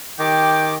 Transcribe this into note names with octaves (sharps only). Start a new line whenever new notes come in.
D#3 G4 G5 D6